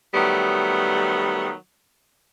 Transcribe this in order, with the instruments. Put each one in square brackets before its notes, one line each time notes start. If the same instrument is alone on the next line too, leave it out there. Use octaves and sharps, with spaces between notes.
[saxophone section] D#3 F#3 G3 A3 B3